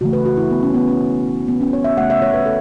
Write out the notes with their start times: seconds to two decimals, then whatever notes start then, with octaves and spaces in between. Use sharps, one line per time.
0.01 C#3 E3 A3 F#4
0.13 B4
0.25 F#4
0.37 E4
0.50 B3
0.63 C#4
0.74 B3
0.87 C#4
1.48 B3
1.61 C#4
1.73 C#5
1.84 E5
1.97 C#3 A3 F#5
2.10 E5
2.22 C#5
2.34 B4
2.46 A4